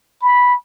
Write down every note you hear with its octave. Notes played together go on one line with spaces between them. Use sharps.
B5